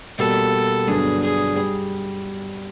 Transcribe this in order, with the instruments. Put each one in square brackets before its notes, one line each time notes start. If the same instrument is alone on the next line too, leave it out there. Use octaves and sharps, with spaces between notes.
[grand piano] B2 G3 A#3 [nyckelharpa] A4
[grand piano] G2 D3 F#3 B3 D4 [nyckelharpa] G#4
[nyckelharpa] G#4
[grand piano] G3